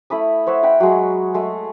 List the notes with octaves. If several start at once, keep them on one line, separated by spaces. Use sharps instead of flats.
A3 E4 B5 D#6
C5 C#5 E5 F#5
D#5 F#5 G5 B5
F#3 G#3
G#3 A3